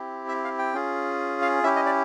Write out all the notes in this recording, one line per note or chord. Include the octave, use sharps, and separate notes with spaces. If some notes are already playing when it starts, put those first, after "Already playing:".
Already playing: C4 E4 G4
E5
F5
G5
C#4 F4 G#4
F5
C#4 E4 G4 E5
D#5
D5